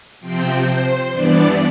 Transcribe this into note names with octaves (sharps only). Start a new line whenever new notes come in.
C3 F3 C4 G5
C5
G2 E3 B3 D4 D5